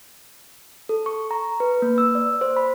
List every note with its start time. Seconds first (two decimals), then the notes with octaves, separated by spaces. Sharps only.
0.89 A4
1.06 C#6
1.31 A#5
1.60 B4
1.82 A#3
1.98 E6
2.15 D5
2.41 C5
2.57 B5